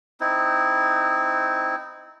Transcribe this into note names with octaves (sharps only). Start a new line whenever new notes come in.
C4 D#4 E4